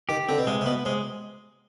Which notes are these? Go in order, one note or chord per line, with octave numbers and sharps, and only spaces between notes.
D#3 G4
D3 C4
B2
C3 G#3
C3
B2 B3
C3 G#3